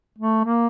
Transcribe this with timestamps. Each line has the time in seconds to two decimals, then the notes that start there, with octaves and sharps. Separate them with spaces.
0.18 A3
0.44 A#3